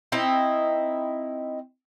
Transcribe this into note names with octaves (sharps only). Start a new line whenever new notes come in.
C4 D#4 E4 D#5